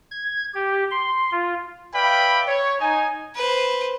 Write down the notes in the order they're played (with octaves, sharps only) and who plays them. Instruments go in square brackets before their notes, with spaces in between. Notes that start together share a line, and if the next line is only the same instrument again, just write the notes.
[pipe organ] G#6
G4
C6
F4
[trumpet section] B4 D5 E5 F5 G5 B5
C#5
D#4 G#5
[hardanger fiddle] B4 C5